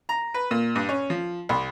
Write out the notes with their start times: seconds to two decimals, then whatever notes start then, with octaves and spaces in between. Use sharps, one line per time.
0.09 A#5
0.34 B4
0.51 A#2
0.75 G2
0.89 C#4
1.10 F3
1.49 C2